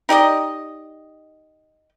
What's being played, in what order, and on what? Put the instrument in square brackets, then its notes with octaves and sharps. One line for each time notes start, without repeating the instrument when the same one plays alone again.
[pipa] D#4 G4 D5 D#5